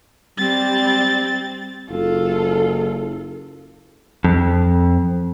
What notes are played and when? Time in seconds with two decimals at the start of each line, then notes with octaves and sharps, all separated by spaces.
0.38 G3 C4 A6
1.90 F#1 F4 A4
4.24 F2